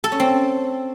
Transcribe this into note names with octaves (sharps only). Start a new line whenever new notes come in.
A4
C#4
C4